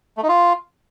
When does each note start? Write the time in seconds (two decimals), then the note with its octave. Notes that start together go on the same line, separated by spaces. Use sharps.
0.17 A3
0.23 D#4
0.29 F4